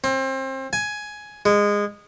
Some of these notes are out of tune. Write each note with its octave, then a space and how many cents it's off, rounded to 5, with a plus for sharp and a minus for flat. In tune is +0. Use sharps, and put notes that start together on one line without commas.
C4 +30
G#5 +10
G#3 -20